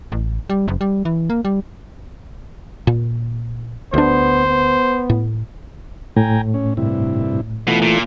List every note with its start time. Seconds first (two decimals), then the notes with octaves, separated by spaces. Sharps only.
0.12 A1
0.50 G3
0.68 F#1
0.81 G3
1.05 E3
1.30 A#3
1.45 G3
2.87 A#2
3.94 D2 B3 D4 C5
4.46 B3
5.10 A2
6.17 A2 G5 G#5 A#5
6.54 C#4
6.77 G2 C3 E4
7.68 B2 E3 A3 F4
7.82 A#2